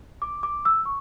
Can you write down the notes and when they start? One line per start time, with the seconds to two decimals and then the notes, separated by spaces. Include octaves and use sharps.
0.22 D6
0.43 D6
0.65 E6
0.85 C#6